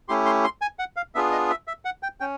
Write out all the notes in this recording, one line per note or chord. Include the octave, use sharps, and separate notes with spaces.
A3 C#4 E4 G4 C6
C6
C6
G#5
F#5
F5
B3 D4 F4 G#4 E5
D#5
E5
E5
F#5
G5
C#4 G5